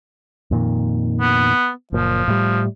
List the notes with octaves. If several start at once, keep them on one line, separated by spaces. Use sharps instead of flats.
F2 A#2 D#3
B3
F#1 A#2 F3
A2 G3